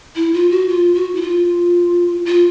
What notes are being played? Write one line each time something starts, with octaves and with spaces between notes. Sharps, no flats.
E4
F4
F#4
F4
F#4
E4
F4
F4